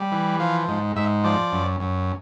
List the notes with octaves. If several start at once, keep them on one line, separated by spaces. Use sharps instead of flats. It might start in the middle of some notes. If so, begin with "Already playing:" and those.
Already playing: G3
E3
F3 F5
G#2
G#2 E5
F3 D5
F#2
F#2